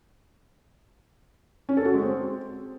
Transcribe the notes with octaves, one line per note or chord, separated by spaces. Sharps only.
C#4
A4
F#4
G#3
C4